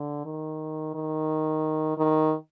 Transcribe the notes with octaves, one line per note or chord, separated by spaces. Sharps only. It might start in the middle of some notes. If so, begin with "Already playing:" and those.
Already playing: D3
D#3
D#3
D#3